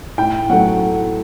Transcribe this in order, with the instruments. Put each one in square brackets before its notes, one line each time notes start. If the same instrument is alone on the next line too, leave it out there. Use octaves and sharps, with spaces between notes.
[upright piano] A2 G5
F#3 A3 F#5